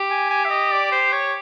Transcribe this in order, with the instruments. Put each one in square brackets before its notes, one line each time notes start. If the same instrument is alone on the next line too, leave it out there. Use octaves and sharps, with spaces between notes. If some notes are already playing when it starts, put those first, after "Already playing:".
Already playing: [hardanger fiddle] G4
[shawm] G#5
G#5
E5
D#5
D5
C5
C#5